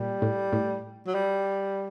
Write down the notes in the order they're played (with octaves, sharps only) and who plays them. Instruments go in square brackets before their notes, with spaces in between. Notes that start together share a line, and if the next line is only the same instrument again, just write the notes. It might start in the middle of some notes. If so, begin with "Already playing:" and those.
Already playing: [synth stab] A#2 [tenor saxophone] G3
[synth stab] A2
A2
[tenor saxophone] F#3
G3